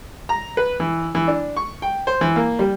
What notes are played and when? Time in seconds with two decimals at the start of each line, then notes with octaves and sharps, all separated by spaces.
0.29 A#5
0.57 B4
0.80 E3
1.15 E3
1.28 D4
1.57 C#6
1.82 G5
2.07 C5
2.21 E3
2.36 A#3
2.59 G3